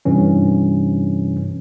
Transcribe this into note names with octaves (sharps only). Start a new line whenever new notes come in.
G2 C3 E3 C#4